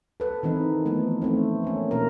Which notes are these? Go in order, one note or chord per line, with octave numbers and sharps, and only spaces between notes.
A4 B4
D#3 E3 C4 D#4
E3 F3 A3 B3
A3 C4
A#3 C#4
B2 A#3 A#4